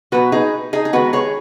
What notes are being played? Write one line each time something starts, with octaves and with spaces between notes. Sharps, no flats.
B2 F#3 B3 F#4 B4
D#4 G#4
D#4 G#4
G#4
D#3 G#3 B3 F#4 B4
G#4 C#5